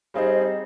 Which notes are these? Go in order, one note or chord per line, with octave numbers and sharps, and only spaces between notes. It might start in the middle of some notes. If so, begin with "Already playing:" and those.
G3 C4 D#4 G#4 D#5 F5